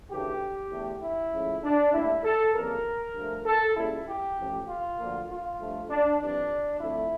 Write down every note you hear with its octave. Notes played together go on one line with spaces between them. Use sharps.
D2 C#3 E3 A3 G4
E2 D3 A3
E4
C#2 C#3 F3 A3
D4
A2 G3 A#3 E4
A4
F2 C#3 E3 G3 A#3 A#4
G2 F3 A3
A4
C#2 C#3 G3 A#3 E4
G4
A1 A2 F3
F4
D2 D3 F3 A#3
F4
G2 F3 A3
D4
F2 E3 G3 D4
F2 D3 A3 E4